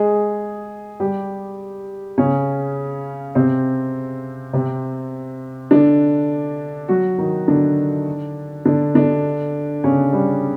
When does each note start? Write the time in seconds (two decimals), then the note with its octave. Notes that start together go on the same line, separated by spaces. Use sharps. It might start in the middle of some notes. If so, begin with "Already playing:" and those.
Already playing: G#3 G#4
1.00 G3 G4
2.18 C#3 C#4
3.35 C3 C4
4.53 C3 C4
5.71 D3 D4
6.88 F#3 F#4
7.18 D#3 D#4
7.48 D3 D4
8.65 D3 D4
8.95 D3 D4
9.84 C#3 C#4
10.13 G3